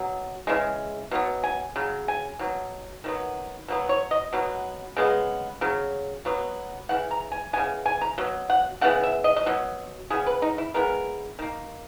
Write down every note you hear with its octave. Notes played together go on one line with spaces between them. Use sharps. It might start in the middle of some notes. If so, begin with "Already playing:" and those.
Already playing: B2 F#3
C#3 E3 G#3
B2 F#3 B3
G#5
C#3 F#3
G#5
B2 F#3
D#3 F#3 B3
B2 F#3 B3
C#5
D#5
B2 F#3 B3
C#3 G#3 B3
C#3 F#3
B2 F#3 B3
C#3 E3 F#5
A#5
G#5
C#3 E3 B3 G#5
G#5
A#5
B2 F#3
F#5
C#3 E3 B3 F#5
E5
D#5
D#5
B2 F#3
C#3 E3 B3 G#4
B4
D#4
E4
C#3 E3 G#3 B3 A#4
D#3 A#3